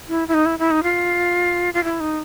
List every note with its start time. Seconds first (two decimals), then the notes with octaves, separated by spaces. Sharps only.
0.09 E4
0.28 E4
0.34 D#4
0.46 E4
0.59 E4
0.71 D#4
0.83 F4
1.74 F4
1.84 E4
2.00 D#4